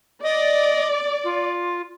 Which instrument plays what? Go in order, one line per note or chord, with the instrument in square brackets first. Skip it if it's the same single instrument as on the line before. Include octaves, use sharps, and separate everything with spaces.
[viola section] D5 [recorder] D#5
[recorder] F4